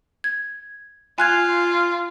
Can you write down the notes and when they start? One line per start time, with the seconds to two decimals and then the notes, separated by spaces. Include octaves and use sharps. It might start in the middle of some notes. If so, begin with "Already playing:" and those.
0.24 G#6
1.18 F4 G#5 F#6 G#6